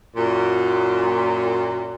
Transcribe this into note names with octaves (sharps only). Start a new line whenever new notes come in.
F#2 A#2